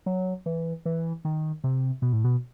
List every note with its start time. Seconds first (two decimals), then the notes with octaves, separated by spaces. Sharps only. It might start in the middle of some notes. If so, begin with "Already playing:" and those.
0.06 F#3
0.46 E3
0.85 E3
1.25 D#3
1.64 C3
2.02 B2
2.13 A2
2.24 B2